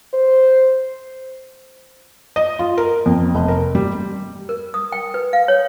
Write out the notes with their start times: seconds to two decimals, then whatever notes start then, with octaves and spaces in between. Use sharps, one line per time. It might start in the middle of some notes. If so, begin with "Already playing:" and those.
0.14 C5
2.36 D#5
2.59 F4
2.78 A#4
3.06 F2
3.35 F1
3.48 A#4
3.75 G3
4.49 A#4
4.74 D#6
4.92 G5
5.14 B4
5.33 F5
5.48 C#5